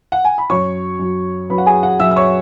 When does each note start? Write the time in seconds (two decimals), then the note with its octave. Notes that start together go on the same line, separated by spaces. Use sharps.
0.12 F#5
0.25 G#5
0.38 B5
0.50 F#2 F#3 C#5 C#6
1.00 F#2 F#3
1.50 F#2 F#3 B4 B5
1.58 F#5
1.66 G#4 G#5
1.83 F#4 F#5
1.99 F#2 F#3 E5 E6
2.11 E6
2.16 C#5 C#6